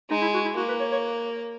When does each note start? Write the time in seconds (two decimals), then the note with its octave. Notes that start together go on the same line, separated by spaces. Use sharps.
0.10 G#3 D#4
0.22 E4
0.34 F#4
0.45 E4
0.57 A#3 F#4
0.69 B4
0.80 C#5
0.92 C#5